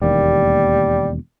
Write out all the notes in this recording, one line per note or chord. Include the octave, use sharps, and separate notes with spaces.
E1 D#2 G3 A#3